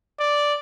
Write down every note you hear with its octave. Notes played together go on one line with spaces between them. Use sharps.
D5